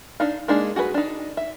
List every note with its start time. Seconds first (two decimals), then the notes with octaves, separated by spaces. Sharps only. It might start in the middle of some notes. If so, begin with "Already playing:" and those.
0.20 D4 D#4 F5
0.48 G#3 A#3 D4 D#4 G#4
0.76 F#4 G#4 A4 B4
0.94 D4 D#4
1.37 E5